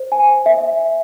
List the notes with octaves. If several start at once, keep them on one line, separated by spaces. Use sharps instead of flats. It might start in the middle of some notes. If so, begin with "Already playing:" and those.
Already playing: C5
G#5
E5